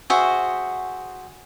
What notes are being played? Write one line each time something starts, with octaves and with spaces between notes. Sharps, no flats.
F#4 G#4 C5 E5